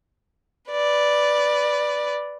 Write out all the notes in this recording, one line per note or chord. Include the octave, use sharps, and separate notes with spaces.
B4 D5